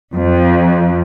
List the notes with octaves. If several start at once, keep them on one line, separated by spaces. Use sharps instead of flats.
F2